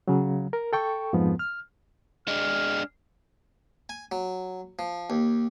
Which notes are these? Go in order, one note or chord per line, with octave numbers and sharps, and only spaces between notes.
C#3 F#3
A#4
A4 G5 C#6
F2 G#2 F3 B3
F6
G#3 D4 F6
G#5
F#3
F3
D#2